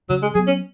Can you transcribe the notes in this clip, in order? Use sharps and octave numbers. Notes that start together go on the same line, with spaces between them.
C#3 F#3
G#3
F#3 B3 G#4
C#4